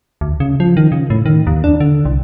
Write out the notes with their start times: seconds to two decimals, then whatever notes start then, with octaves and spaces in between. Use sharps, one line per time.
0.21 D2
0.40 C#3
0.60 F3
0.77 D#3
0.92 C#3
1.10 A2
1.26 D#3
1.47 D#2
1.64 D4
1.80 D3
2.05 C2